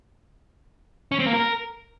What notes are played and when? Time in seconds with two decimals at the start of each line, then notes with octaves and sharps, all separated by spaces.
1.12 C#4
1.19 C4
1.27 A#3
1.34 A#4